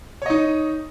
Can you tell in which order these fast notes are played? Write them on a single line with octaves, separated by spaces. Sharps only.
C#5 D#5 D#4